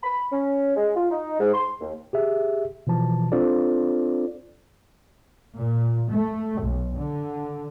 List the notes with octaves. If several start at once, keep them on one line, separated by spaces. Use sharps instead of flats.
B5
C#4
G#3
F4
D#4
G#2
C6
D#2
G4 G#4 E5
B2 E3 F3 A5
C4 D4 F4 A4 C5 D5
A#2
A3
B1
D3